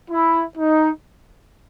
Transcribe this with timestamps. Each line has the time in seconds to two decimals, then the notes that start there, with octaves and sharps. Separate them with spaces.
0.11 E4
0.58 D#4